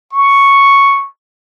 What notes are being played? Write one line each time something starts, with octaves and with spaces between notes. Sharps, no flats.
C#6